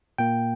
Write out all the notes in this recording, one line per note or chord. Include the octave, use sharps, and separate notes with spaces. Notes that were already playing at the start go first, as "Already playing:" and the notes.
A#2 A#3 G5